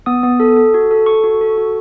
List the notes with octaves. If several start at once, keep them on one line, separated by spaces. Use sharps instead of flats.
B3 D#6
B3
A4
A4
F#4
A4
A4 C#6
F#4
A4
F#4